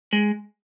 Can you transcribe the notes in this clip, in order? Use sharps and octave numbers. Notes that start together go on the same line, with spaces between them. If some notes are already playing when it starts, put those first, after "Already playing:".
G#3